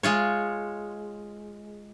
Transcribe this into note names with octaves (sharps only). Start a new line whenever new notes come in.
G#3 F4 C#5